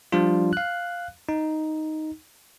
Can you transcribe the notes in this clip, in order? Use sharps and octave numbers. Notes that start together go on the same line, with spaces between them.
F3 G3 D4 F4
F5 F#6
D#4